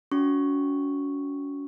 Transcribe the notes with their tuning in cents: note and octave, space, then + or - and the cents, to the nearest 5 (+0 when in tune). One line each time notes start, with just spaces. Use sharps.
C#4 +40 F#4 +0 C#6 +0